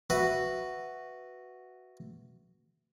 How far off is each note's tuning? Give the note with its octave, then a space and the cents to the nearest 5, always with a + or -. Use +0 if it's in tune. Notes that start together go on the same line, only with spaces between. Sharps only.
F#4 +0 B4 +0 E5 +0